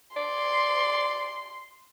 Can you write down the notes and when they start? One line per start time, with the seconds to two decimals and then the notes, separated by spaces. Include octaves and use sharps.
0.17 D5 C6